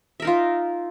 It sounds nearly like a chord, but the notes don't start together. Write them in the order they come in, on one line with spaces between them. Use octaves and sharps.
E5 A#4 D#4 F4